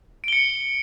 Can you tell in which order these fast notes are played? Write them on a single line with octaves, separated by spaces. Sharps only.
D7 G7 C#7